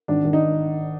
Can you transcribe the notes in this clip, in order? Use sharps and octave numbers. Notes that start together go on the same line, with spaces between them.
G#1 D4
G#1
D#4